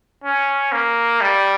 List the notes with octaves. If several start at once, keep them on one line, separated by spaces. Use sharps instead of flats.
C#4
A#3
G3